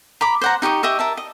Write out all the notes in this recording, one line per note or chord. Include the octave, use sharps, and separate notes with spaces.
A#5 B5 D6
C5 F#5 A#5
D#4 G4 C#6 D#6
G4 D#5 E5 C#6
A#4 E5 A5
D#5